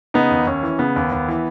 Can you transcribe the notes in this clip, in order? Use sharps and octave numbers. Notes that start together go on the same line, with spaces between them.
C#3 B3 D#4
D#2
D#2 C#4
E3
C#3 B3
D#2
D#2
E3